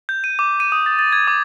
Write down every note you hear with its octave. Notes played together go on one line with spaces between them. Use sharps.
G6
D#7
D6
D#7
D#6
A6
A6
G#6
D6